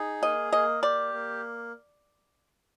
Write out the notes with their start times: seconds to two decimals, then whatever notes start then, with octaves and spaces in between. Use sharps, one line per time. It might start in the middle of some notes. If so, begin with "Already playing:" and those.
Already playing: D#4 G#4
0.22 A#3 D#5
0.53 A#3 D#5
0.82 G4 D5
1.13 A#3